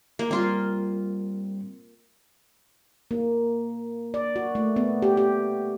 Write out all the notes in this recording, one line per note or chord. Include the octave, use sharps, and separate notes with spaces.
A#3
G3 A#3 C4 F4 C6
A#3
D5
F#4
A3
B3
G4
G4